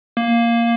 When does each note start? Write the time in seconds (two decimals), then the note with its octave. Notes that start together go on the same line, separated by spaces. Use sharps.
0.17 A#3